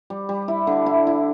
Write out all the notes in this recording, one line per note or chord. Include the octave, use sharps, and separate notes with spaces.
G3
G3
E4
D3
E4
E4